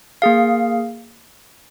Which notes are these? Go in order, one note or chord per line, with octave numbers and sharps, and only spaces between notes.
A#3 G#4 F5